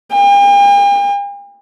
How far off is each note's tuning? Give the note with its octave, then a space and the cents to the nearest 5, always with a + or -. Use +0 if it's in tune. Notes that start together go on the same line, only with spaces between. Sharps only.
G5 +45